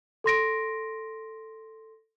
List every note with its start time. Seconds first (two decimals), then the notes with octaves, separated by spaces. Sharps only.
0.24 A4 C6 A#6 D7